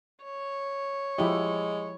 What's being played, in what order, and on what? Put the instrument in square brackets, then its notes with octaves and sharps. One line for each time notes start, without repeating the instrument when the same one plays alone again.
[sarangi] C#5
[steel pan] F3 E4 G4 [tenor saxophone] G#3